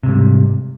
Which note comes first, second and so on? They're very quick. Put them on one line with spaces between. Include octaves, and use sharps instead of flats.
C3 G#2 G3